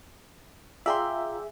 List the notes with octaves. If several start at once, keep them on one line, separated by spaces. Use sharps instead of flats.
F4 G#4 D5 E5 F5 G5 A#5 C6